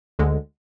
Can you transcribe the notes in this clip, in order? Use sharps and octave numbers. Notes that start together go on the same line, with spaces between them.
D2 D3 G#3